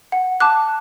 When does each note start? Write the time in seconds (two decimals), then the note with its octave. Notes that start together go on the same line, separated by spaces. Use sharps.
0.12 F#5
0.40 A5 D6 F#6